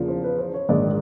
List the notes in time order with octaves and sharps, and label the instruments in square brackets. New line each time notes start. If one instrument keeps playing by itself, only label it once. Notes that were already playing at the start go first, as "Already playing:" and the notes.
Already playing: [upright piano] E2 C#3 F3 A#3
C5
B4
C5
C#5
A#1 G#2 D#3 G#3 D5